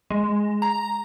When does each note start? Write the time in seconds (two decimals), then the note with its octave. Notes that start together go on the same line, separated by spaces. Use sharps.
0.10 G#3
0.62 A#5